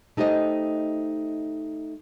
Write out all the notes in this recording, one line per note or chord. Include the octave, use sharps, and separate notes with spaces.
A3 D#4 G4 C5 D#5